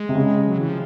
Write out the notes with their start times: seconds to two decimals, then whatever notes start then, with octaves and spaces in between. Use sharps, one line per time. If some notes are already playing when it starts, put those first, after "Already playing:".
Already playing: G#3
0.09 C3
0.15 C#3
0.48 F#3
0.58 E3
0.69 F3